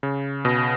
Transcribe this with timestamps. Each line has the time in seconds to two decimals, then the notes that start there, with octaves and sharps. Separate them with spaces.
0.03 C#3
0.45 B2